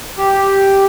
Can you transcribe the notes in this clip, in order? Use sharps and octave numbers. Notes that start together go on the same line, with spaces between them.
G4